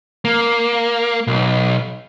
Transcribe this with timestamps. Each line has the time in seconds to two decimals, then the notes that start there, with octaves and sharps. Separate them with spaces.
0.25 A#3
1.27 B1